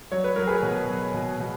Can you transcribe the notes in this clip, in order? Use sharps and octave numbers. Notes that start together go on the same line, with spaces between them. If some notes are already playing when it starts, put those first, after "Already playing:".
F#3 C#5
B4
F#3 A#4
G#4 B4
B2
F#3
B2
B2